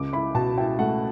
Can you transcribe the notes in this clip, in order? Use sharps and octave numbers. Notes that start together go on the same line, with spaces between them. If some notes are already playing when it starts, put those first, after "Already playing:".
Already playing: C#2 D6
E4 B5
B2 A5
E4 G5
A3 F#5